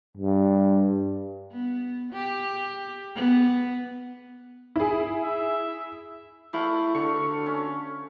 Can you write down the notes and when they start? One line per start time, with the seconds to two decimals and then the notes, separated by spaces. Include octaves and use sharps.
0.17 G2
1.52 B3
2.13 G4
3.15 B3
4.76 E4 G#4
5.23 E5
6.53 A3 E4 F5
6.95 D3 C#6
7.46 C#4